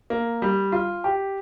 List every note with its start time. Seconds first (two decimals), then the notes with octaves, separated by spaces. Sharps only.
0.10 A#3
0.42 G3
0.72 F4
1.04 G4